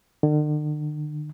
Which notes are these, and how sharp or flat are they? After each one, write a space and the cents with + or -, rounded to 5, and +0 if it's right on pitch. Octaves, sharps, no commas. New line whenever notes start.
D3 +45